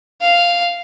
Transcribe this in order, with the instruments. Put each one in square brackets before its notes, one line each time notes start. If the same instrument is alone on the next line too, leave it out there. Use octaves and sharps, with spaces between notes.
[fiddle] F5